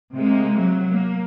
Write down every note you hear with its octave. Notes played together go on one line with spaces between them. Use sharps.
C3 G#3 A#3
F#3
A#3